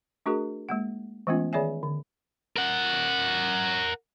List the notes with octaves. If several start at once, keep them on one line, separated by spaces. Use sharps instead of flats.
A3 D4 F#4 G#4 A#4
G#3 A#3 F#5
E3 G#3 A3 B3 C#4 F4
D#3 G#4 C#5 D5 E5 G#5
D3
A#4 F#5